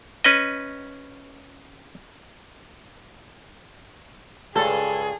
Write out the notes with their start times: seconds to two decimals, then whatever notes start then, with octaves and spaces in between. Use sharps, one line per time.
0.24 C#4 B4 D#5
4.56 C#2 G2 G#4 A4